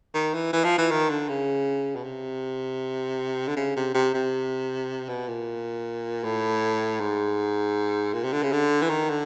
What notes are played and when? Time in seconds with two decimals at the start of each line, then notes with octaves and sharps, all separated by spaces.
0.14 D#3
0.34 E3
0.52 E3
0.64 F3
0.78 E3
0.91 D#3
1.10 D3
1.28 C#3
1.95 B2
2.04 C3
3.47 D3
3.57 C#3
3.76 C3
3.94 C3
4.14 C3
5.09 B2
5.28 A#2
6.24 A2
7.00 G#2
8.13 A#2
8.24 C3
8.32 D3
8.43 C#3
8.52 D3
8.82 E3
8.89 D#3
9.09 D3